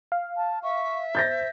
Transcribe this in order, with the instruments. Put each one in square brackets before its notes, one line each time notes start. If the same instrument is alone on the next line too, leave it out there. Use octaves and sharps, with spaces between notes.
[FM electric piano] F5
[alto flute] A5
[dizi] E5 [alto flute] C#6
[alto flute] C5 [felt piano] G6 A6 A#6